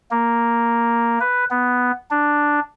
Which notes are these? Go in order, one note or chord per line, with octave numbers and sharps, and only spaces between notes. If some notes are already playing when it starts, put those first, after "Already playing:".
A#3
B4
B3
D4